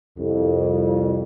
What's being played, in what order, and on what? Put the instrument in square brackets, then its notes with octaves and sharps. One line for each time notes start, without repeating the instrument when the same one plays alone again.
[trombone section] C2 F2